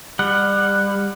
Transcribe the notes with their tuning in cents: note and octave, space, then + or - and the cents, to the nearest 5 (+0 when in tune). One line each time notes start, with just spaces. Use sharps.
G3 +25 F#5 +0